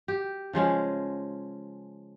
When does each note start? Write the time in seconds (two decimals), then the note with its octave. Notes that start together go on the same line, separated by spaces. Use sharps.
0.08 G4
0.53 C#3 F3 G#3 C#4